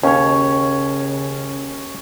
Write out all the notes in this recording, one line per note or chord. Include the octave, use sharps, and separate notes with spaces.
D#2 C#3 C#4 C#5